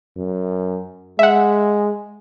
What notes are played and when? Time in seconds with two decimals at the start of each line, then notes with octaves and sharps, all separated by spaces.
0.17 F#2
1.19 G#3 E5 F#5